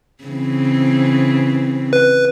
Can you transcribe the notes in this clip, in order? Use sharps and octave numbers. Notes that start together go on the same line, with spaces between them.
C#3 E3 C4
B4